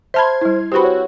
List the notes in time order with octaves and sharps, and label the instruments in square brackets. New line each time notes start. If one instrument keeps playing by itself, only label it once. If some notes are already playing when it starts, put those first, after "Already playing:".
[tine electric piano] C5 [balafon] E5 A5 B5 [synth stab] C6 F6 G#6
[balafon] G3 E4
[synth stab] C4 F#4 [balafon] G4 B4 B5
[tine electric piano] C#5